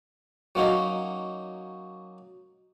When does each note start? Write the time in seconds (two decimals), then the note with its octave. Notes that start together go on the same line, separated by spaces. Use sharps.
0.55 F#3 A#3 C#4 D#4